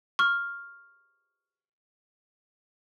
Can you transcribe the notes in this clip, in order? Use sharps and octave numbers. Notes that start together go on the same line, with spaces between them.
C#6 F6